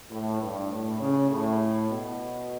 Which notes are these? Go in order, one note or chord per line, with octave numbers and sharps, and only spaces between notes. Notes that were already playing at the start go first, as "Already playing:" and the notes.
A2
G2
A2
C#3
A2
B2